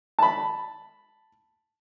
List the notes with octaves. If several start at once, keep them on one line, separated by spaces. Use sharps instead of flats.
A5 B5